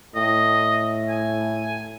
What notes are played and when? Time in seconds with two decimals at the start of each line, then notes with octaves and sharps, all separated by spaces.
0.15 A2 D#5
1.09 G#5